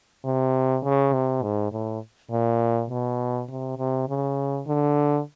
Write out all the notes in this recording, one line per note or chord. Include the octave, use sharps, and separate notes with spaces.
C3
C#3
C3
G#2
A2
A#2
B2
C3
C3
C#3
D3